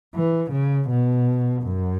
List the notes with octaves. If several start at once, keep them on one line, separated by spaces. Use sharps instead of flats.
E3
C#3
B2
F#2